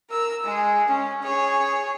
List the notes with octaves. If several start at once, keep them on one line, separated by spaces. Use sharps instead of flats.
A#4 E6
G#3 G#4
C#4
G#4 C#5